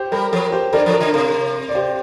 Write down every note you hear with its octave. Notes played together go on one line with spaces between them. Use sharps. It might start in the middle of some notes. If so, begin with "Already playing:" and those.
Already playing: G4 C5
G3 A#4
F3 A#4
G4 C5
D3 A#4 D5
F3
A#4
D3
C3 A#4
D5
G4 C5